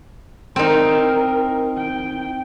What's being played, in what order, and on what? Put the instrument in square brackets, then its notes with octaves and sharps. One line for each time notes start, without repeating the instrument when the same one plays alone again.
[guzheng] C4 D#4 [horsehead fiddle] A#4
[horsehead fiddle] G5